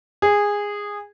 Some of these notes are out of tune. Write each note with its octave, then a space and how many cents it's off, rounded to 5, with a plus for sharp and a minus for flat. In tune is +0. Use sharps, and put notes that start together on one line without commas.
G#4 -15